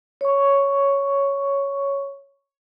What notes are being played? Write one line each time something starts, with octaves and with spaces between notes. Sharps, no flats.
C#5 C#6